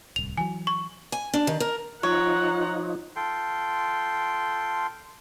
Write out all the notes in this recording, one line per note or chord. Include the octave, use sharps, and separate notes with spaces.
D1 C2 F7
E3 F#3 G#5
C#6
G#5
D4
D#3
A#4
F3 D#4 F4 C#5 F#5 A#5
F4 A4 G5 C6